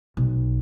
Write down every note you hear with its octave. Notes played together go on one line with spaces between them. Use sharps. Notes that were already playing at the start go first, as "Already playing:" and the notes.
B1